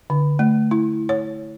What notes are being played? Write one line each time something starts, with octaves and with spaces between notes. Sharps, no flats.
D3
A3
E4
C#5